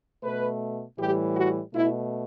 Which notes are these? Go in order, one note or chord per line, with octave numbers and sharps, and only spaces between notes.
B2 A3 B4
A2 E3 G3 G4
F#4
B2 A3 E4